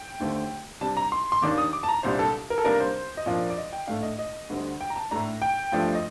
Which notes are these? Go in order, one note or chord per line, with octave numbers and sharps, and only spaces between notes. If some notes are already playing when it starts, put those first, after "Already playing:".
Already playing: G5
D#2 D3 A3 C4
C3 G3 D4 A5
A#5
C6
C6
D#2 D#3 A#3 D4 D6
D#6
D6
A5
A#5
C2 A#2 G3 D4 C5
A4
A#4
A4
C3 G3 A#3 D4 A#4
C5
D#5
A#2 F3 A#3 D4 D5
D5
D#5
G5
A2 A3 D4 F5
D#5
D#5
D2 D3 G3 C4
G5
A#5
A5
A2 A3 D4 A#5
G5
G2 F3 A3 D4
D#5